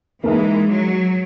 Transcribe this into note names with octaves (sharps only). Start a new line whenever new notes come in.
E3 G#3 A#3 D#4 A#4 E5
F#3